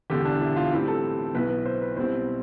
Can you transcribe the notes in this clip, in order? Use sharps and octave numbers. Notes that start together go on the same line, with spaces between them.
E1 E2 D3 G4
D4
E4
F4
A2 E3 G3 C4 E4 G4
A4
B1 B2 B3 E4 B4
B4
C5
B4
B1 B2 G3 C4 E4 C5